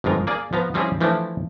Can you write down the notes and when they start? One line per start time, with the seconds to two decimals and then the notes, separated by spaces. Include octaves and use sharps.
0.04 G1 F2 G#3 F4 A#4
0.27 A#3 G#4 D5
0.53 F3 B3 A#5
0.74 F3 G3 C4 C#4 E4 G#4
1.01 E3 F3 A3 C4 D4 E4